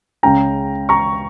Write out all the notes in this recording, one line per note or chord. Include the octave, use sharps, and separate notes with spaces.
C#2 C#3 G#3 C#4 G5 A#5
A#5 C#6